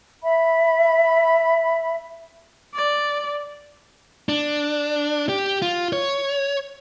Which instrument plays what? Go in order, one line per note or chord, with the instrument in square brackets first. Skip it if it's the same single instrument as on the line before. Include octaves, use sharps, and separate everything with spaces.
[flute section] E5 B5
[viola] D5
[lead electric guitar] D4
G4
F4
C#5